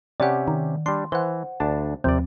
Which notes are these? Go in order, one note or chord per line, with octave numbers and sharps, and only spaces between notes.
C3 C#4 G4 D5 F#5
D#3
G3 D4 C6
E3 C5 F#5
D2 D4 A5
D#2 C3 F3 C4 D5